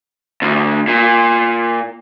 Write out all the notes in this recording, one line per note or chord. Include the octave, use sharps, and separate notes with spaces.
D2
A#2